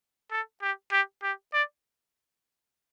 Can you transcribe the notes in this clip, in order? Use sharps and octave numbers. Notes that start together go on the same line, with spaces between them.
A4
G4
G4
G4
D5